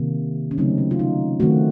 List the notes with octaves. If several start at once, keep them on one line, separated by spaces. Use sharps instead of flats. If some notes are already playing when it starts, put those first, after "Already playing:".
Already playing: C3 D#3 A#3
C#4
C#3 F#3 A3 C4 D#4
C#4
F4
D#4
D#3 A3 C4 F#4